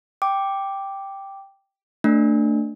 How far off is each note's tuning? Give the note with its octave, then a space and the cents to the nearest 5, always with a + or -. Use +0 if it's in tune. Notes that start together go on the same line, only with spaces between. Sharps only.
G5 +0 D6 +0
A3 +25 D4 +0